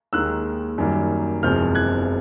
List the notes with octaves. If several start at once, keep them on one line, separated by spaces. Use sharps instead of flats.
D#2 D#3 G#3 E6 F#6
F#2 D#3 G3 A#3
F#1 E2 C3 F3 G#3 F6 G6
F#6 G#6